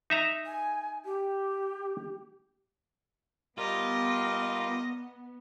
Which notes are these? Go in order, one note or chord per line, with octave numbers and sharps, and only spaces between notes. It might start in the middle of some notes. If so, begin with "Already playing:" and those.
D#4 E5 A#5
G#5
G4
G3 B3 F4 G4 A#4 D#5